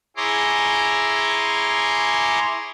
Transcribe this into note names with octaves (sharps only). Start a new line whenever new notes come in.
E4 G#4 C#5 A#5 C6 D6